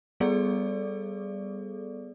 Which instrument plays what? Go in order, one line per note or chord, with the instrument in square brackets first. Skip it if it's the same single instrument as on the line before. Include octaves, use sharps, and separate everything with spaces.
[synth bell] G3 B3 G#4 A4 D5